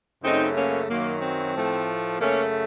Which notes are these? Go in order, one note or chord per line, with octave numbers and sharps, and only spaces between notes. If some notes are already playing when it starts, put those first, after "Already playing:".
F#2 C#3 A3 C4 D#4
A#3 C#4
F#2 D#3 F#3 A#3
C4
A2 F3 A3
F#2 C#3 A3 A#3 C#4